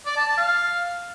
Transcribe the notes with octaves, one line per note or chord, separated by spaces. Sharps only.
D5
A5
A5
F5